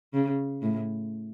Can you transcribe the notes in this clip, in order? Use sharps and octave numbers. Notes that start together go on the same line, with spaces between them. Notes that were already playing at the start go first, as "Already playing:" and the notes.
C#3
A2